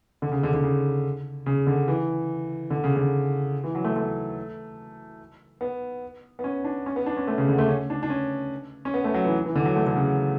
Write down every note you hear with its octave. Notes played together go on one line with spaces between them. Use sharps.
D3
C#3
D3
D3
C#3
C#3
D3
E3
D3
C#3
D3
E3
F#3
A3
A3
B3
B3
C#4
D4
C#4
B3
D4
C#4
A3
C#3
D3
A3
C#4
D4
D4
C#4
C#4
B3
A3
F#3
E3
E3
D3
F#3
A3
D3
C#3